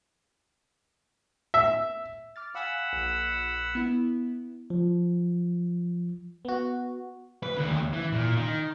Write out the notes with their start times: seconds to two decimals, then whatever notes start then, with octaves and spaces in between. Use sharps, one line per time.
1.54 E5
2.36 D6 F6 A6
2.55 F5 F#5 G#5 B5 E6
2.93 A#1
3.75 B3 E4
4.70 F3
6.45 B3 F#4
7.43 B4
7.57 D#2 D3
7.93 E3
8.12 A#2
8.37 D#3